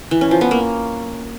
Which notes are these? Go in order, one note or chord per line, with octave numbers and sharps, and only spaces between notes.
E3
C#4
F3
B3
A#3